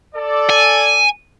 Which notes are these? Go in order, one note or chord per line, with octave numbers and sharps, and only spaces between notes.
A4 D5
G#5